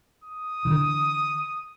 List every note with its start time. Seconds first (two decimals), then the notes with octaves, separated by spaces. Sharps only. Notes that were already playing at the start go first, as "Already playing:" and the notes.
0.24 D#6
0.65 D3 E3